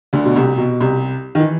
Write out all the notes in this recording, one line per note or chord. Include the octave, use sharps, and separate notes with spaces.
D2 D3
B2
C2 C3
B2
C2 C3
D#3
E3